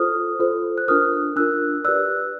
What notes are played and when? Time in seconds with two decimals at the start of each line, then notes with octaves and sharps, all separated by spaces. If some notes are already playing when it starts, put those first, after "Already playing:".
Already playing: F4 A4 C5 D#6 F6
0.40 F4 A4 C5
0.78 F#6
0.88 D4 F4 A#4 D#6 F6
1.36 D4 F4 A#4 E6 F#6
1.84 G4 B4 D5 E6 F#6